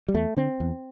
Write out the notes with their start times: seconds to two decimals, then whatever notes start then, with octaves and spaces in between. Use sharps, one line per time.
0.08 G3
0.14 E2 A3
0.37 D3 C4
0.60 E2